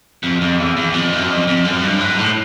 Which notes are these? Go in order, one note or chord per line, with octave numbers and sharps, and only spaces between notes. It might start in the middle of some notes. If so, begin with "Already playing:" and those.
F2
F2
E2
E2
F2
F#2
F2
F2
F#2
G2
G#2
A2